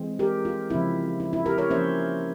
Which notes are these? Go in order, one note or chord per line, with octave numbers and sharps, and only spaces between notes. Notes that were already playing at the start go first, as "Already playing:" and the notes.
Already playing: E3 G#3 C4
G4 A#4
F4
C#3 F3 C4 E4
E4
E4
G4 A#4
A#4 C#5
F3 A#3 C#4 C5 E5